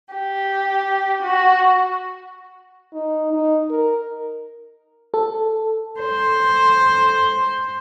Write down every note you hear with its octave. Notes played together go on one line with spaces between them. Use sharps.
G4
F#4
D#4
D#4
A#4
A4
C5